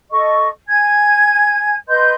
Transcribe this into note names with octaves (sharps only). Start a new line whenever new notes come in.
A4 D#5 C#6
G#5 G#6
B4 D#5 C6 G6